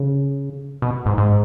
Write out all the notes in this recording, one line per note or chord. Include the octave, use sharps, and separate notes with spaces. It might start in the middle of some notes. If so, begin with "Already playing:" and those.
Already playing: C#3
B2
G#2
G#2